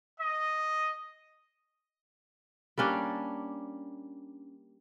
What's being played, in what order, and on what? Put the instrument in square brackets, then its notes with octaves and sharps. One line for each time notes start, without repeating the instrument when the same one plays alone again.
[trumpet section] D#5
[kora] G3 A#3 C#4 D4